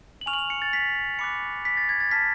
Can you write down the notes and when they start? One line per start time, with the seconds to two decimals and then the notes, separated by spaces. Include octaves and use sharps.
0.21 F#7
0.26 G#5 C#6 F6 F7
0.33 F#7
0.38 F7
0.50 C#7
0.62 A6
0.73 B6
1.19 B5 D6 F#6 C#7
1.65 B6
1.77 A6
1.89 G#6
2.00 A6
2.11 A5 F6 B6